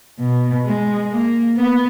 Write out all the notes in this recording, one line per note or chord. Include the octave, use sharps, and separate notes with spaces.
B2
G#3
A#3
B3